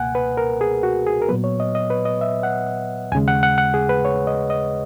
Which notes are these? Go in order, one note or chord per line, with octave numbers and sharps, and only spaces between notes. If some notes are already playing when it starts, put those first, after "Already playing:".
Already playing: C#2 B2 A#3 F#5 G#5
B4
A#4
G#4
F#4
G#4
A#4
A#2 F#3 B3 B4
C#5
D#5
D#5
B4
D#5
E5
F#5
D#2 C#3 G#3 G#5
F#5
F#5
F#5
G#4
B4
C#5
D#5
D#5